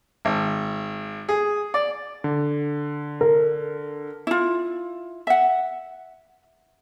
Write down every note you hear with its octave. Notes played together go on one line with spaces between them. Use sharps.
G#1
G#4
D5
D3
A#4
E4 F4
E5 F#5